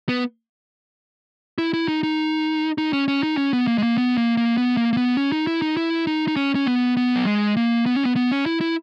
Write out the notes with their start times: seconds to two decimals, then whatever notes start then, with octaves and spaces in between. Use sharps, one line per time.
0.09 B3
1.58 E4
1.73 E4
1.88 D#4
2.03 D#4
2.78 D#4
2.93 C#4
3.08 C#4
3.23 D#4
3.37 C#4
3.53 B3
3.67 A#3
3.78 G#3
3.83 A#3
3.98 B3
4.17 A#3
4.37 A#3
4.57 B3
4.77 A#3
4.93 A#3
4.97 B3
5.17 C#4
5.32 D#4
5.47 E4
5.62 D#4
5.77 E4
6.07 D#4
6.28 D#4
6.36 C#4
6.55 C#4
6.66 B3
6.97 B3
7.16 F#3
7.26 G#3
7.57 A#3
7.86 B3
7.95 C#4
8.04 B3
8.16 B3
8.31 C#4
8.46 E4
8.61 E4